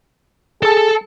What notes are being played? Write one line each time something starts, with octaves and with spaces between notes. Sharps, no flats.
G#4 A4 A5